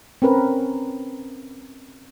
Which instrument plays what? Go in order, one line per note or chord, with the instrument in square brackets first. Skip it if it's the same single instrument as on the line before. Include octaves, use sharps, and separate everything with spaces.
[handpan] C4 C#4 A#4 B4